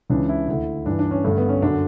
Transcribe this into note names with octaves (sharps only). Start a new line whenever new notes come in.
C#2 C#3 E3 D4
E4
D2 D3 E4
G2 E3 D4
D4
C#4
G2 D3 A3
B3
C#4
F#2 D3 D4